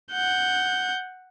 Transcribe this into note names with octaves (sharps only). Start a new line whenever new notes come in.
F#5 G6